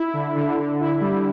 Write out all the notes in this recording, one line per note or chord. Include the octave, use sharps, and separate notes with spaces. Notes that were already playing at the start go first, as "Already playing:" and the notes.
Already playing: E4
D3
D3
D3
E4
G3